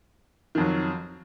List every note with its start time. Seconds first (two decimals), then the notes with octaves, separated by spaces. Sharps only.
0.55 D#3
0.58 F2
0.60 F#3